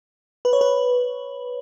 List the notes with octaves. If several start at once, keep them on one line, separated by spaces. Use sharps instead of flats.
B4
C#5
B4